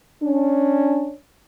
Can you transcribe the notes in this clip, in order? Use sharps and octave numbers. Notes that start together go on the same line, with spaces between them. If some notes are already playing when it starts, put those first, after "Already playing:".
C#4 D4